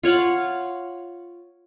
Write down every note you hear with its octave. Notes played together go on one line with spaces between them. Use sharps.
F4 C#5 F5 F#5